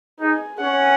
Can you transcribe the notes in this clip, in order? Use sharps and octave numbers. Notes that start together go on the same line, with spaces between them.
D#4 G#4
C#4 F#5